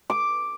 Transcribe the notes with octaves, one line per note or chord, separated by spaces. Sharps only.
D6